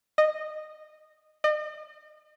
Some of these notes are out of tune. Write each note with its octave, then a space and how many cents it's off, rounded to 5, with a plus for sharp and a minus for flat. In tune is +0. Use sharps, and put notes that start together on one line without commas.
D#5 -15
D#5 -40